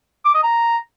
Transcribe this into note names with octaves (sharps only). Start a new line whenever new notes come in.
D6
D#5
A#5